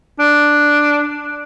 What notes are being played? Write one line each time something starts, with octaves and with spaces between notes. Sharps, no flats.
D4